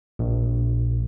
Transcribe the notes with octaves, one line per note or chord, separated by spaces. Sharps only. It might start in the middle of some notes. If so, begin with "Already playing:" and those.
A#1